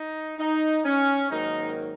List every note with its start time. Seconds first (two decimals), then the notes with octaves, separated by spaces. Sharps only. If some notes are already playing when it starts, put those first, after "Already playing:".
Already playing: D#4
0.39 D#4
0.85 C#4
1.31 G#2 D#3 F#3 A#3 D#4